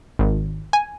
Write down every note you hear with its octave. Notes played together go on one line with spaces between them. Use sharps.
G#1
G#5